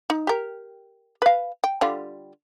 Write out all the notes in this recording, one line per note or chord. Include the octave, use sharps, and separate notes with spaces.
D#4
G4 A#4
B4 F5
G5
D3 G3 F4